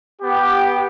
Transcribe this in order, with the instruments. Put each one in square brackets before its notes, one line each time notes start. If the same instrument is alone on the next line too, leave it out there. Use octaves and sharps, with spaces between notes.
[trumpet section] B3 G4